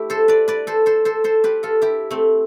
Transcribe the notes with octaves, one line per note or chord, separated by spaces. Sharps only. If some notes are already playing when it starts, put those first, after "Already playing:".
Already playing: A3 E4 G4
A4 C5
B4 D5
B4 D5
A4 C5
A4 C5
A4 C5
A4 C5
G4 B4
F4 A4
E4 G4
A3 C4